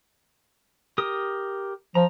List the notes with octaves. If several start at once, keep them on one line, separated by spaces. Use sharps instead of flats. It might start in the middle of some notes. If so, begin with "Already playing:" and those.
G4 A#4 D#6
F3 A#5